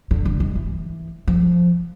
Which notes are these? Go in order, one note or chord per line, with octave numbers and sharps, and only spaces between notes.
D3
D3
D#3
E3
F3